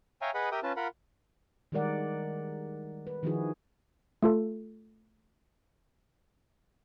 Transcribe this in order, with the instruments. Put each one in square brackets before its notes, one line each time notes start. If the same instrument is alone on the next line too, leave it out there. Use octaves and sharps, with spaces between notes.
[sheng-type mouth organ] C#5 E5 F5 G5 G#5 A#5
G#4 B4 D#5 F#5 B5
G4 A#4 E5 G5 D#6
C#4 F4 B4 A5
F4 A#4 F#5 B5
[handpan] D#3 G3 G#3 A#4 D5 F#5
B4
D#3 F3 D#4 E4 F#4 G#4
[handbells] A3 F4 A4